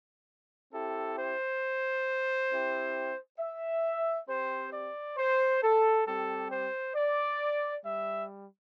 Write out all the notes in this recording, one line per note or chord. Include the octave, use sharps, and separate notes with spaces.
C4 E4 G4 A4
C5
C4 E4 G4
E5
C4 G4 C5
D5
C5
A4
G3 C4 G4 A4
C5
D5
G3 E5